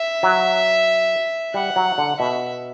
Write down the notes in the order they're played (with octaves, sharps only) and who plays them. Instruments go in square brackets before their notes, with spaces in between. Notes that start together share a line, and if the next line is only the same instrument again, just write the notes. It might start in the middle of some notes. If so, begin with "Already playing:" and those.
Already playing: [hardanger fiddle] E5
[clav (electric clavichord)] F#3
[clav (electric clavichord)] G3 [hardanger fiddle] F#5
[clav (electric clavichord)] F#3
D3
[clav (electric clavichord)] B2 [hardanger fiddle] E5